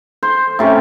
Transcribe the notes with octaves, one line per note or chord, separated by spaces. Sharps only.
C5
A2 C3 C#4